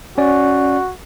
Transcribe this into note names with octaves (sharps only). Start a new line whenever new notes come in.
C#4 F#4 D5